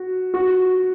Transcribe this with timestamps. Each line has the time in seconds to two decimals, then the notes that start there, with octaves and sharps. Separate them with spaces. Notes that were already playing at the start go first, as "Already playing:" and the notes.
Already playing: F#4
0.34 F#4